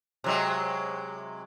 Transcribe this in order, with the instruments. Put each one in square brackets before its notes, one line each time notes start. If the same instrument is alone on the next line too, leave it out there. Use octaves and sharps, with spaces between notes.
[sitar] C3 F#3 G#3